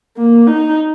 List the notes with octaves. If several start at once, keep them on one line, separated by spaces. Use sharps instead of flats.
A#3
D#4